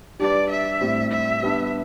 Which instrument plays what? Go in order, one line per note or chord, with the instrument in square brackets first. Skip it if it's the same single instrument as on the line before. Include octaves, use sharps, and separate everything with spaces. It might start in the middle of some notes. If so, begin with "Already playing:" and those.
[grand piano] G3 D4 G4 B4 [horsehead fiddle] D5
[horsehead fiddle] E5
[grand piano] A2 G3 C4
[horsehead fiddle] E5
[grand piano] G3 B3 D4